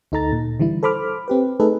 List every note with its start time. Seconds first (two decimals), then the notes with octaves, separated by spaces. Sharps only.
0.12 D2 D#4 A4 A#5 A6
0.32 A#2
0.60 D3 E3 G3 E4
0.83 A4 C5 B5 D6 F6
1.28 C4 G4 B4
1.60 A3 D#4 G#4 A4 B4